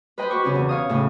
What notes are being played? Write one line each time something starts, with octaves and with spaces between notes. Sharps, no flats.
B4 C5 D#5 G5 B5 C6
F#4 B4 C#6 D6
C#3 C4 C#4 F#4 G4
E2 B2
C#5 F5 D#6
A2 C#3